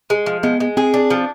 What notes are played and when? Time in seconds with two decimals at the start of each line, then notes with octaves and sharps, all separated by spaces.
0.10 G#3
0.26 F3
0.43 G#3 B3
0.60 G#3
0.77 C4 G#4
0.94 D4
1.10 F3